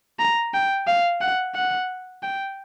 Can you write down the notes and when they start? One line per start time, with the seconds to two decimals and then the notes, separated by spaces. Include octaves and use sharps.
0.19 A#5
0.54 G5
0.88 F5
1.21 F#5
1.55 F#5
2.23 G5